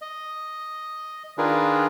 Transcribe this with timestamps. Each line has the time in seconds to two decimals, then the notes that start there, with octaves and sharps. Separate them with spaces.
0.02 D#5
1.38 D#3 D4 F4 G#4 A#4 B4